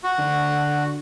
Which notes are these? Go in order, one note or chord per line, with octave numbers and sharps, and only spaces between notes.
F#4
D3